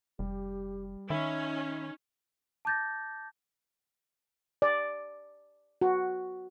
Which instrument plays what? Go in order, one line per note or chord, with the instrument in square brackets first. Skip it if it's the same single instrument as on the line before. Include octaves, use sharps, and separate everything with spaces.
[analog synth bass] F1 [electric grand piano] G3 [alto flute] G4
[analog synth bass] D#3 [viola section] C#4 [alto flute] D#4 [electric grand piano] E5 B5
[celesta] A5 D6 G6 A6 A#6
[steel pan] D5
F#4